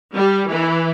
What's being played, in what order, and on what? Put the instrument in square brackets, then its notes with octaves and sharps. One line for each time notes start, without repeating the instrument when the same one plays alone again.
[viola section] G3
E3